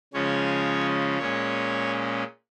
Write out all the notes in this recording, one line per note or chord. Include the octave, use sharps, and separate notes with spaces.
C#3 F3 G#3 C#4 C#5
A#2 G#3 C#4 C#5